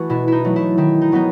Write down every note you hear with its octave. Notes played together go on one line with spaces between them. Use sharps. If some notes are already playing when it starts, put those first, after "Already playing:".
Already playing: E3 A3 F#4 B4
B2 E4
D#4 E4
F#3 A3
E4
D#3 E4
D#4
F#3 B3 D#4